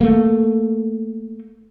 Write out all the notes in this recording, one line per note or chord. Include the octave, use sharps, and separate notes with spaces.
A3 A#3